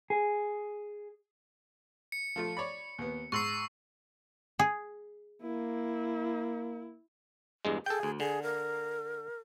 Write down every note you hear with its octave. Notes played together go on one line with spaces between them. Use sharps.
G#4
C#7
F3 A3 F4
C#5 D5 B5
D#2 B3
G#2 C6 C#6 E6 C7
G#4
A#3 E4
E2 G2 G#3
G#4 A4 G5
D2
D3 G#4
A#4